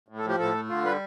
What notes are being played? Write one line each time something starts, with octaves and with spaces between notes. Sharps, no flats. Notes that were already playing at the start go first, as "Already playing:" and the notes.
A2
A4
F3
G4
A2 A4
A3
D3 F4
G3 B4